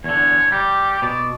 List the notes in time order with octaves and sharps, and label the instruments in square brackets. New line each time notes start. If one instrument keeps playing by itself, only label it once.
[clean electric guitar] E2 D3 [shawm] C#5
[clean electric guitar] G3 [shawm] G4
[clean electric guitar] B2 [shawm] D5